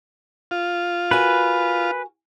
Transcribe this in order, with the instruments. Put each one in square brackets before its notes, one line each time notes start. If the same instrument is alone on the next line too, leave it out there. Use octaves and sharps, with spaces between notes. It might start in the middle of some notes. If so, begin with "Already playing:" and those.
[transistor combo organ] F4
[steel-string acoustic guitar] F#4 A#4 G#5 [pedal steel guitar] B4